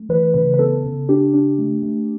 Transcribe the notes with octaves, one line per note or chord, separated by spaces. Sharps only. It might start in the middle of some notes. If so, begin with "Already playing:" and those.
Already playing: A3
E3 B4
C#3 B4
B4
B3 A4
C#3
D4 G4
D4
A3
A3